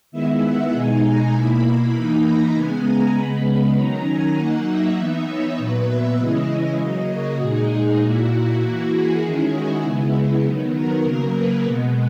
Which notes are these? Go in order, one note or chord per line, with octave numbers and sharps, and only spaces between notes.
D#3 G#3 B3 E4 E5
F#5
B2 G#3 D#4 G#5
A#5
B2 A#3 E4 B5
E3 A#3 D#4
A#5
C#3 G#3 B3 G#5
A#5
C#3 G#3 B3 B5
B5
D#3 F#3 C#4 A#5
G#5
F#3 A#3 D#4 F#5
E5
E3 B3 D#4 E5
C#5
A#2 F#3 B3 B4
E5
C#3 E3 G#3 C#4 E4 D#5
C#3 F#3 A#3
F#4
A#2 G#3 D#4 G#4
G#4
A#2 A#3 E4 F#4
F#4
E3 A#3 E4 F#4
G#4
D#3 G#3 C#4 E4 G#4
F#4
C#3 G#3 B3 E4
D#3 F#3 B3
A#4
C#3 F#3 A#3
B4
B2 G#3 B3